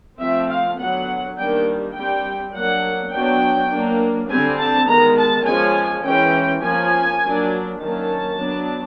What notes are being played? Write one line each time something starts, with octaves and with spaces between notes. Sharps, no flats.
F3 A3 C4 E5
F5
D3 F#3 B3 F#5
D#3 G3 A#3 D4 G5
G3 C4 G5
F#3 A#3 D4 F#5
F#3 B3 D4 G5
F#3 A#3 D4
D3 G3 C4 G#5
A5
D#3 G#3 B3 A#5
A5
F3 G#3 C#4 G#5
E3 G#3 C#4 G5
F3 A#3 C#4 G#5
F#3 A#3 D4
D#3 F#3 A#3 C#4 A5
F#3 B3 D4